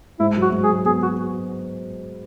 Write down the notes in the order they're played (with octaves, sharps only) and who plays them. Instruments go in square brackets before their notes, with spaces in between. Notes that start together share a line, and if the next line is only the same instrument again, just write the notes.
[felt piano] G#2 [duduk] E4
[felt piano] F#3
[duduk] F#4
[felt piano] G#2
[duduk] G#4
[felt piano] F#3
[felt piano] B3 [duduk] G#4
[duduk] F#4